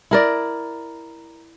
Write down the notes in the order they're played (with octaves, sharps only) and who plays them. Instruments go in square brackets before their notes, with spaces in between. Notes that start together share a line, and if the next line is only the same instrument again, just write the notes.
[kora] E4 A#4 D5